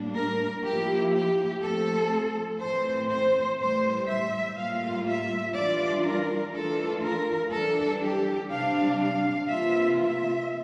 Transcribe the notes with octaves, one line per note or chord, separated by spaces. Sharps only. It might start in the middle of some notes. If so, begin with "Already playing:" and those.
Already playing: A2 G3 A#3 D4
A#4
F3 A#3 E4 G4
G4
F3 A3 C4 A4
A2 E3 A3 C4 C5
C5
A2 E3 G3 C5
E5
A2 G3 A#3 F4 F5
E5
E3 G3 D4 F4 D5
A#4
E3 A3 D4 F4 A4
A#4
E3 G3 D4 A4
G4
C3 G3 D4 F5
F5
C3 E3 A#3 F4 E5
E5